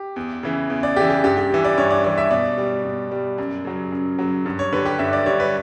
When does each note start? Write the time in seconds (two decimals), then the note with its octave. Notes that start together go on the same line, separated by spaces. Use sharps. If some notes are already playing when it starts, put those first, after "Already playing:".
Already playing: G4
0.16 E2
0.43 C#3 E3
0.70 E2
0.83 D5
0.96 C#3 E3 G4
1.10 G4
1.24 G2 G4
1.37 G4
1.51 E3 G3
1.65 D5
1.78 G2 C#5
1.91 D5
2.04 E3 G3 D5
2.18 E5
2.31 B2 D5
2.58 G3
2.85 B2
3.12 G3
3.38 F#2
3.65 C#3 F#3
3.92 F#2
4.19 C#3 F#3
4.46 G2
4.59 C#5
4.72 D3 G3 B4
4.86 G4
4.99 G2 E5
5.13 D5
5.26 D3 G3 C#5
5.40 B4